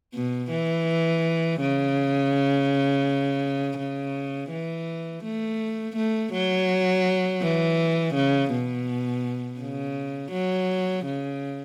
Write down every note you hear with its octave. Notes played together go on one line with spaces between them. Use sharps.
B2
E3
C#3
C#3
E3
A3
A3
F#3
E3
C#3
B2
C#3
F#3
C#3